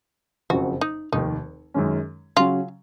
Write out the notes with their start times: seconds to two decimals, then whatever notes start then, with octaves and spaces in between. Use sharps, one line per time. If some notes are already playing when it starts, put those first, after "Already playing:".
0.50 F#1 F2 C#3 F#3 F#4
0.81 D#4
1.12 F1 D#2 D#3 D#4
1.74 F#2 D#3 G#3 C#4
2.36 C#3 F#3 C#4 F4